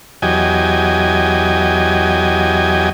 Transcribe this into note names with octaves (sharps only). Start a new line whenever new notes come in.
E2 F#3 G4 D#5 G#5